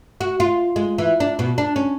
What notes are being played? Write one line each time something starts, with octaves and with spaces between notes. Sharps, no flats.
F#4
F4
G#3
E3
D4
B2
D4
C#4